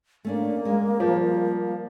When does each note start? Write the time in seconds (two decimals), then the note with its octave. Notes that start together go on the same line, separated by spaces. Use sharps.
0.25 A3 A#3 C#4 D4
0.65 G#3
1.00 F3 G3